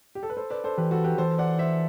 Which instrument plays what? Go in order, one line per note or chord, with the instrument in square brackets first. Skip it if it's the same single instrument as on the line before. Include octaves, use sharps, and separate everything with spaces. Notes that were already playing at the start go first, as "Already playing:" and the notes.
[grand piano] G4
A4
B4
A4 C5
B4 D5
A4 C5
[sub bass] E3 [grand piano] G4 B4
[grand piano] F#4 A4
G4 B4
[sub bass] E3 [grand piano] A4 C5
[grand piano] D5 F#5
C5 E5